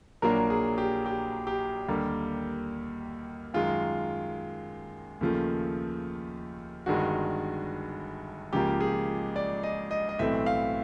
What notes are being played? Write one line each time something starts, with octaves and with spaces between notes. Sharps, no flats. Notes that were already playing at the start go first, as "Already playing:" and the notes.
A#1 A#2 F#3 A#3 D4 A#4
G#4
G4
G4
G4
D#2 D3 G3 A#3
F#2 D#3 G#3 F4
D#2 C#3 F3 A3
G1 G2 D#3 G#3 F#4
C#2 C#3 F3 A#3 G4
G#4
D5
D#5
D#5
D#5
B1 A2 E3 A3 C4 E5
F5